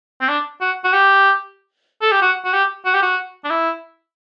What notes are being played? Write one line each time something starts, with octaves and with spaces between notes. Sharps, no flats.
C4
D4
F#4
F#4
G4
A4
G4
F#4
F#4
G4
F#4
G4
F#4
D4
E4